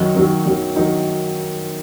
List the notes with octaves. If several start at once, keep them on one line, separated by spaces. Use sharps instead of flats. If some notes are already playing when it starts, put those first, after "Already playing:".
Already playing: F#2 D#3 F#3 D#4
F#2 D#3 F#3
F#2 D#3 F#3
D#3 F#3 D#4